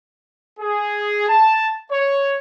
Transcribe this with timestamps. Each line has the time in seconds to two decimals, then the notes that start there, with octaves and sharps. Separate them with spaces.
0.60 G#4
1.28 A5
1.92 C#5